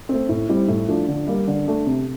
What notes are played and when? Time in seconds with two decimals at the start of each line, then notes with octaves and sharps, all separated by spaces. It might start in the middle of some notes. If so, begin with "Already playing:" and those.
0.09 A3 C4
0.29 A2
0.49 G3 C4 E4
0.68 A2
0.88 F3 A3 D4
1.08 D3
1.27 G3 A#3
1.47 D3
1.67 A3 D4
1.87 C3